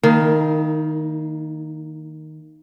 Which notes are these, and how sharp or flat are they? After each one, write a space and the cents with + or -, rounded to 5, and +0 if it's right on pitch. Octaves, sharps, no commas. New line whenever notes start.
D#3 +0 A#3 -15 E4 -40